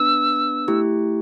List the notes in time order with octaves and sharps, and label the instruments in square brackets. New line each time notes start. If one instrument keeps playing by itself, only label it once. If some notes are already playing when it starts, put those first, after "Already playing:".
Already playing: [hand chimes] B3 D4 B4 [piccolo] E6
[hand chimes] A3 E4 G4